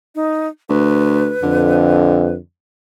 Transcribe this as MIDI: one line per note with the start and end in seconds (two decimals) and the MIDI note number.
0.15 0.48 63
0.69 1.33 38
0.69 2.35 71
1.43 2.38 41
1.43 2.38 50